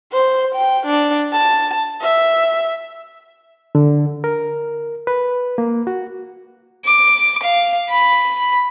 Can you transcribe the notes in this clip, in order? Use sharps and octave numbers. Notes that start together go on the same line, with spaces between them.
C5
G5
D4
A5
E5
D3
A#4
B4
A#3
F#4
D6
F5
B5